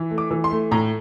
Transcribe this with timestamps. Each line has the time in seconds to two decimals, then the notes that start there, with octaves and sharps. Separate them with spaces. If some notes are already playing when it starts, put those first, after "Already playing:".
Already playing: E3
0.11 A3
0.18 D6
0.31 E3
0.44 C6
0.51 A3
0.71 A2 A#5